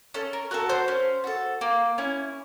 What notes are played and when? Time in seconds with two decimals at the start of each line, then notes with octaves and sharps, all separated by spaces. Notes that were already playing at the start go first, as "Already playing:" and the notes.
0.14 C#4 A4
0.33 A#4
0.51 F#4 A4 A#4
0.69 C5
0.88 C#4
1.24 F#4 A4
1.61 A#3
1.98 C#4 E4